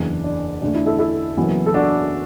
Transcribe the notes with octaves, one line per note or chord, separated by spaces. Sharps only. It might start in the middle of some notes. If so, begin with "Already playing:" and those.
Already playing: F#1 E2 E3 D4
D4
E2 D3 A3 D4
E4
E4 A4
E4 A4
F#1 F#2 E3 B3
A4
D4 F#4